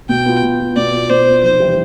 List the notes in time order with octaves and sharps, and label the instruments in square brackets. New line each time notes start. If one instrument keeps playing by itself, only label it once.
[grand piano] B2 [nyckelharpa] G5
[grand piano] B3 F4
B2
B3 F4
[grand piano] B2 [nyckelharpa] D5
[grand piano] B3 F4
[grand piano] B2 [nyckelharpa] C5
[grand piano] B3 F4
[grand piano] F1 [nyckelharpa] C5
[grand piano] E3 G3